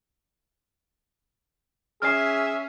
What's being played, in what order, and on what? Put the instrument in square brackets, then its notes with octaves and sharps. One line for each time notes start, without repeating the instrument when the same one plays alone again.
[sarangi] C#4 [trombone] G#4 [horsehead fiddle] E5 [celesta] F6 C7